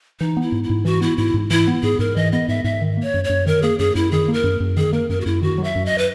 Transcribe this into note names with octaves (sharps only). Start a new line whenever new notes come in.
E3 D#4
B3 E4
G#2
E4
G#2
E3 F#4
B3 E4
G#2 E4
G#2
E3 E4
B3
G#2 G#4
G#2 A#4
E3 D#5
B3 D#5
G#2 E5
G#2 E5
D#3
A#3
C#5
F#2
C#5
F#2
D#3 A#4
A#3 G#4
F#2 G#4
F#2 E4
D#3 G#4
A#3
A#4
F#2
F#2
D#3 G#4
A#3 A#4
F#2 A#4
F#4
F#2 E4
D#3 F#4
F#3
E5
F#2
D#5
B4